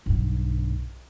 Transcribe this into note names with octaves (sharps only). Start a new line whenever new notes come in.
B1 G2